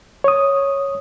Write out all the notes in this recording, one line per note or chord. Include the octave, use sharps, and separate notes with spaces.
C#5 D#6